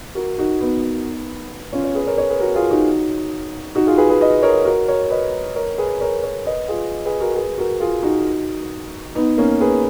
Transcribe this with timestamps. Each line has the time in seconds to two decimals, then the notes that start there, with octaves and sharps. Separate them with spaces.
0.15 F#4 A#4
0.38 D#4 F#4
0.60 B3 D#4
1.73 C#4 F4
1.84 C#5
1.95 G#4 B4
2.07 A#4 C#5
2.18 C#5
2.29 G#4 B4
2.40 F#4 A#4
2.55 F4 G#4
2.70 D#4 F#4
3.75 D#4 F#4
3.87 F4 G#4
3.98 G#4 B4
4.09 G#4 B4
4.20 B4 D#5
4.42 A#4 C#5
4.65 F#4 A#4
4.88 A#4 C#5
5.10 B4 D#5
5.55 A#4 C#5
5.78 G#4 B4
6.01 A#4 C#5
6.23 A#4 C#5
6.46 B4 D#5
6.68 F4 G#4
7.05 G#4 B4
7.20 F#4 A#4
7.35 G#4 B4
7.58 F#4 A#4
7.80 F4 G#4
8.03 D#4 F#4
9.15 B3 D#4
9.38 A#3 C#4
9.60 G#4 B4